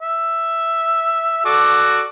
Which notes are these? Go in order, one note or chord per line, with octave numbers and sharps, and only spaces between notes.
E5
F#4 A4 D5